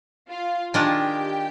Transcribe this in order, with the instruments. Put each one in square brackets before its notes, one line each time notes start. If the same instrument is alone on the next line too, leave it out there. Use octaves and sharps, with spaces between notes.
[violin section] F4 F5
[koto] D#3 G#3 D4 F4 [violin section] G4 G5